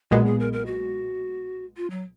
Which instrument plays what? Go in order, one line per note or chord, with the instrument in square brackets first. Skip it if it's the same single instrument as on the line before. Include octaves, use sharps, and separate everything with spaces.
[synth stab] B1 A#2 G#3 B3 [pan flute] F#4
[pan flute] G#4
A#4
A#4
F#4
F4
F#3